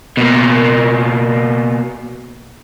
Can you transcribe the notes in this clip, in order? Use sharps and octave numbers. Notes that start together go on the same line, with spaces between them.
B2 A#3